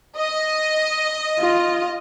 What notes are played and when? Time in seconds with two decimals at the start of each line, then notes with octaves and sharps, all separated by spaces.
0.17 D#5
1.40 F4